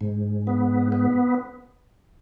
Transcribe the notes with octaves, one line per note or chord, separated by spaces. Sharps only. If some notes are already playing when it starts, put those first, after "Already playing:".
G#2
B3
B3